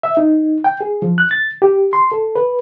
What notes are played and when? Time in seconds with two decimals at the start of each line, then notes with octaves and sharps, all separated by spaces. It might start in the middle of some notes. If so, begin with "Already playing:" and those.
0.03 E5
0.17 D#4
0.64 G5
0.81 G#4
1.02 F3
1.18 F#6
1.31 A6
1.62 G4
1.93 C6
2.12 A4
2.36 B4